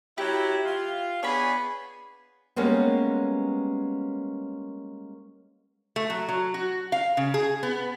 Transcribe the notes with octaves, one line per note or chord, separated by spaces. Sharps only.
F#3 E4 G4
F4
B3 D4 G#4 C#5 G#5 B5
G3 G#3 A#3 B3 C#4
A3
F#3
F#3
F#4
F5
C#3
G#4
B3